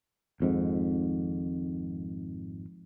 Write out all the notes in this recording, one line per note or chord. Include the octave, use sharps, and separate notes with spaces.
G#1 F2 G#2